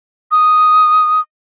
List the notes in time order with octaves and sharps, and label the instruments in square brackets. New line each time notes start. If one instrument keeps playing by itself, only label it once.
[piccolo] D#6